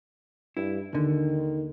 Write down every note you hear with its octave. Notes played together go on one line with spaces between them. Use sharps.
G2 E4
D#2 D3 D#3